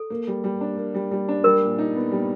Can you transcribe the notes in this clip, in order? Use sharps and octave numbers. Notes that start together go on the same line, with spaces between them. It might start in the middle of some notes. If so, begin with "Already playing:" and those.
Already playing: A4
A#3
G3
G3
D4
A#3
G3
G3
D4
G3 A#4
A#2
D#4
B3
G3